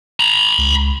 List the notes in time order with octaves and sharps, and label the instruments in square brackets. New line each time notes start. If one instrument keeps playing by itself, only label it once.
[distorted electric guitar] A#5 B5
[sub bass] C#2